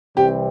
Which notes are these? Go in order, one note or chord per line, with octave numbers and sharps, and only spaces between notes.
C2 C3 E3 G3 C4 G4